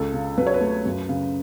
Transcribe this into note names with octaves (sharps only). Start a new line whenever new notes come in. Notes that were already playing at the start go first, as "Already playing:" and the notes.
Already playing: C#2 A4
C#3
F#3 B4
C#5
B4
A3
F#2
C#3